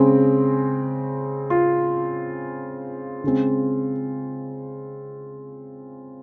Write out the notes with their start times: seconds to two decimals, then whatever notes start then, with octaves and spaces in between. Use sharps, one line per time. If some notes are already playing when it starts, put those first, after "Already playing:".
Already playing: C#3 G#3 C4
1.50 F4
3.24 C#3 G#3 C4